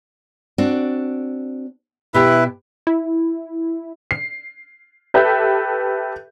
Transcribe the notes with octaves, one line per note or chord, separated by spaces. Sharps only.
C4 D4 F#4
B2 E4 G4 B4 E5 G5
E4
C7
G4 A4 B4 E5 G6